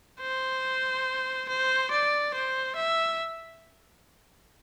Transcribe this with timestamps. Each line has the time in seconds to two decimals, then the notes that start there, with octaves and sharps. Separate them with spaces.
0.21 C5
1.49 C5
1.91 D5
2.34 C5
2.76 E5